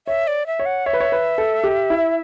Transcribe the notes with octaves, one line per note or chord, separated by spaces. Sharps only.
C#5 E5
D5
E5
C#5
F#5
C#5 E5
B4
C#5
B4
A4
G4
E4